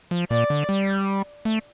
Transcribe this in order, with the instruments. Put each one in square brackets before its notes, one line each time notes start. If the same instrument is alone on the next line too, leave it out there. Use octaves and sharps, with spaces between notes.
[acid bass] F3
[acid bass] A#2 [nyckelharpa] D5
[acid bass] D3
G3
A3